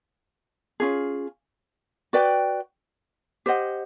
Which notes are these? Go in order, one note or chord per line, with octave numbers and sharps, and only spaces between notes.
C#4 F4 G#4
F#4 B4 D5 G5
G4 C5 D#5 F#5